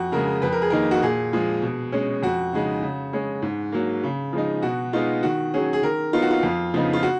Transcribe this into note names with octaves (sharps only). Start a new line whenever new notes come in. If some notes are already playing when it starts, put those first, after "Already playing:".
Already playing: F2 F#4
C#3 G#3 A#4
F2 B4
A#4
G#4
D#3 A#3 D#4 A#4
F#4
A#2 G#4
F3 G#3
B2
G#3 C#4
F2 F#4
C#3 G#3 D#4
C#3
G#3 C#4
G#2
F#3 A#3
C#3
F3 G#3 D#4
B2 F#4
G#3 B3 D#4 F4
D#3 F#4
F#3 C#4 G#4
G#4
D#3 A#4
F#3 B3 D#4 F4
F#4
F4
F2
C#3 F3 B3 D#4
F4
F#4